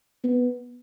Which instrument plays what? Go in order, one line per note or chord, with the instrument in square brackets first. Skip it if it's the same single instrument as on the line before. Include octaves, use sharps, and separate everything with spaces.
[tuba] B3